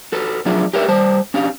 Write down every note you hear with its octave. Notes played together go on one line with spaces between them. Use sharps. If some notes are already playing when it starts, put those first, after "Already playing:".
F#4 A4 B4
F2 F#3 D4 F4 G#4 E5
G4 A#4 B4 C#5 E5
G3 C5 A5
C#4 D4 G4 F5